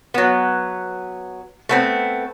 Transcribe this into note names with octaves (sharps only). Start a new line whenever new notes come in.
F#3 B3
A3 B3 C4